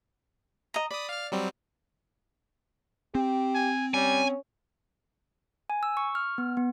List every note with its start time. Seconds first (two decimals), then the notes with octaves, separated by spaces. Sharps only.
0.74 D#5 A#5
0.91 D5 B5 D#6
1.09 F5 F6
1.32 F#3 G3 C4
3.15 C4 G4
3.55 G#5
3.94 G3 C#4 G#5
5.70 G#5
5.83 E6
5.97 C#6
6.15 F6
6.38 B3
6.57 B3